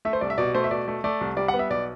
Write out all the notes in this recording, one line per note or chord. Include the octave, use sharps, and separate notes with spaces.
A3 E5
C5
C2 D5
E5
B2 D5
A3 C5
E5
B2 D5
A3
A3 D5
C2
G3 D5
F#5
B3
E5
B1 D5